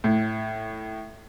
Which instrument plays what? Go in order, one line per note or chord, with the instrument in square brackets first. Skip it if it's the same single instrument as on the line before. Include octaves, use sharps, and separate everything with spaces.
[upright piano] A2